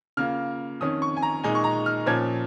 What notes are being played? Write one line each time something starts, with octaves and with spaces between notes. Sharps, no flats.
C#3 A#3 F4 F6
F2 D#3 C#4 D#6
C#6
G#5
A#5
A#2 G#3 D#4 G#5
C#6
A#5
F6
A#2 F3 C#4 G#6